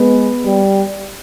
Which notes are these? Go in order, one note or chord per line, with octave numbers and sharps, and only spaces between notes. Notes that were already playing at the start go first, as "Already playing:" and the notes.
Already playing: G#3 B3
G3